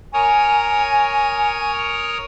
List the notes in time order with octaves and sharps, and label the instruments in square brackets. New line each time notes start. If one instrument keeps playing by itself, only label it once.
[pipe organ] A#4 C#5 D#6 [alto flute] G#5